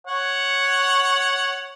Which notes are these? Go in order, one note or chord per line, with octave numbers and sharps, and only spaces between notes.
C#5 F#5